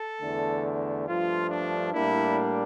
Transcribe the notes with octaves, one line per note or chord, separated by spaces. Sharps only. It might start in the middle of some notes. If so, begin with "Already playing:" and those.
Already playing: A4
E2 D3 A3
G2 F3 A3 F4
D4
A2 G3 A#3 D4 E4